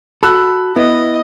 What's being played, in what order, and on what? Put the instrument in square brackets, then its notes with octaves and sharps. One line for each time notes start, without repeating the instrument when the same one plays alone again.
[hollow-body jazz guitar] F#4 A4 [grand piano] B5 E6 F#6
[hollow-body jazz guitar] B3 E4 [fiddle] D#5